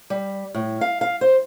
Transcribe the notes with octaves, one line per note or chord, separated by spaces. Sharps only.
G3
A2
F5
F5
C5